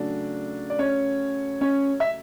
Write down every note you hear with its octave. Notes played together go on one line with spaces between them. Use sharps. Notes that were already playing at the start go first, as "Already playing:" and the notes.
Already playing: C#3 F#3 A3 D4 D5
D5
C#4 C#5
C#4 C#5
E5